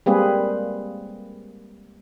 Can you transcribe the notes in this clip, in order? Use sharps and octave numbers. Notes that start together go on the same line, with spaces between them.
G3 G#3 A#3 C4 G#4 B4